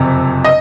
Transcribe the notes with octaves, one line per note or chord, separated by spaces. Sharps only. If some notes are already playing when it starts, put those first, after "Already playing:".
Already playing: F#1 F2 C3
D#5